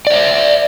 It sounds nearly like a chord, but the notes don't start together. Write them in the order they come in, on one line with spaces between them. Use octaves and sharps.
D5 C5 E5